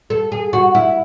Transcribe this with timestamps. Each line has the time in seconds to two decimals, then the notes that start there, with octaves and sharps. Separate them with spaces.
0.10 A4
0.32 G#4
0.53 F#4
0.75 E4